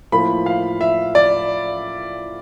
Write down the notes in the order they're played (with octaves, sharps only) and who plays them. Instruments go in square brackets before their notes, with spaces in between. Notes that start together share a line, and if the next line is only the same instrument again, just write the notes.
[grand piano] A2 F3 A#3 B5
F5
E5
D5